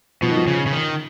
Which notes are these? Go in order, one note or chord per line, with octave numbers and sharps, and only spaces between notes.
B2 F3
D#3
F3
C#3
C#3
D#3